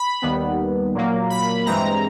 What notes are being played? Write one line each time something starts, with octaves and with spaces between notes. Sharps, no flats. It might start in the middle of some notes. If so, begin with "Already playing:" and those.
Already playing: B5
D#2 D#3 G3 B3
A#2 F#3 A#3
B5
G2 E3 G#3 C4 A#5